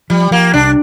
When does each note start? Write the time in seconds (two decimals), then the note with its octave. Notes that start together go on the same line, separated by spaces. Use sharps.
0.10 F3 G3
0.31 F3 A#3
0.53 C2 D4